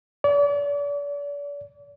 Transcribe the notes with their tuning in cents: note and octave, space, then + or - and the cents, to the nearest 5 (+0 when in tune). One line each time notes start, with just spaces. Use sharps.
D5 -40